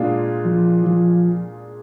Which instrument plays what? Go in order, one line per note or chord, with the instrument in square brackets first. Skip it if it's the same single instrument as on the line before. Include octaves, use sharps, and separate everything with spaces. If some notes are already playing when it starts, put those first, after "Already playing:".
Already playing: [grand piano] A#2 G#3 D4 F4 G#4
[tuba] F3
F3